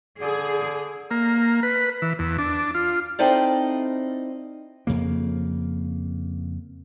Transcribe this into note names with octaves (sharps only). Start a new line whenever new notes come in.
D3 G#4
A#3
B4
E3
E2
D4
F4
C4 D#4 E4 A4 C5 D5
F2 C#3 A#3